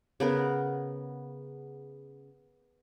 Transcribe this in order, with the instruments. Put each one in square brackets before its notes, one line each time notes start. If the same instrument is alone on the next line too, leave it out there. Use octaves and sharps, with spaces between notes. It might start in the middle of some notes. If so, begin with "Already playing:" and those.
[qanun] C#3 B3 A#4